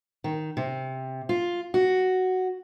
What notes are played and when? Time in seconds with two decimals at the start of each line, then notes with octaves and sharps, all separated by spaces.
0.24 D#3
0.57 C3
1.29 F4
1.74 F#4